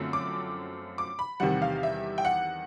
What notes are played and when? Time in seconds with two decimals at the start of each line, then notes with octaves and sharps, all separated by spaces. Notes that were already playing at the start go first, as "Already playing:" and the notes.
Already playing: F#2 D3 F3 A3 C4
0.13 D6
0.98 D6
1.19 B5
1.40 E2 C3 D#3 G3 F#5
1.62 F5
1.83 E5
2.18 G5
2.25 F#5